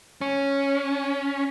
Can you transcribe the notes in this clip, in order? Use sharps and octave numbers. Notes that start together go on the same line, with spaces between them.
C#4